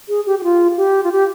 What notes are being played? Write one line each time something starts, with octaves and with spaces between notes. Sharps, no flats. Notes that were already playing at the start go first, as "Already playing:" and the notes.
G#4
G4
G4
F4
G4
F4
G4